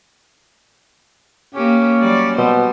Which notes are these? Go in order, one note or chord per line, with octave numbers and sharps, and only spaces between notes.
A#3 C#4 G4
F#3 G3 D5
B2 G3 C5